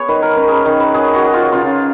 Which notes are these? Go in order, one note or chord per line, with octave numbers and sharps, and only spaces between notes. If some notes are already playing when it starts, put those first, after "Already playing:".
Already playing: B3 G#4 C#5
D#3 B4
A#4
C#4 B4
G#4 A#4
D#3
B4
F#3 G#4
F#4
F#3
F4
C#3 F4